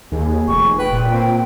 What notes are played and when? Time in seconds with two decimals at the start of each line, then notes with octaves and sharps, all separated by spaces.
0.12 D#2 G#4
0.48 F1 C#6
0.79 B4 G5
0.93 A#2
1.13 C4